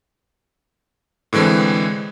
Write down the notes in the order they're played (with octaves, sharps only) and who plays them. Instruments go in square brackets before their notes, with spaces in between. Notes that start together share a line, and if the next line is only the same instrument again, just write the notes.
[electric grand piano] A2 D3 E3 G#3 C4